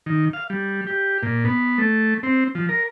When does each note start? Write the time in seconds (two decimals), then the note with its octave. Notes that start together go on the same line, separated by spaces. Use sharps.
0.06 D#3
0.33 F5
0.50 G3
0.87 G4
1.23 A#2
1.45 B3
1.78 A3
2.23 C4
2.55 F3
2.69 A#4